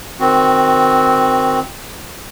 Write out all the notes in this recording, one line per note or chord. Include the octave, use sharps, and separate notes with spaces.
D#3 C4 F#4